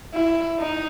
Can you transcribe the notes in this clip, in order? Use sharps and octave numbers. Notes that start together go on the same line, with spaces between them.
E4
D#4